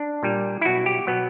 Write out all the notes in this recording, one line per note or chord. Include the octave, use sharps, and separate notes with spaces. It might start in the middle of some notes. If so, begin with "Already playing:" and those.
Already playing: D4
A#2 G3
E4
B2 F#3 F#4
G4
B2 F#3 B3